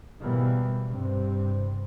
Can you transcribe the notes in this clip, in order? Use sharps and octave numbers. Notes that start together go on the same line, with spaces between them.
G#2 B2 E3 G3 A#3 B3
G2 C3 G3 C4